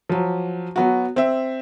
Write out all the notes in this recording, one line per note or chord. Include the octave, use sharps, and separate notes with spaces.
F3 F#3
F#3 B3 F#4
C4 E5